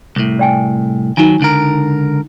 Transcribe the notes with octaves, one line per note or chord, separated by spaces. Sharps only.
C2 A2
D5 G5 G#5
D#3 F#3 D#4 G#5 A5
C#2 D3 A#4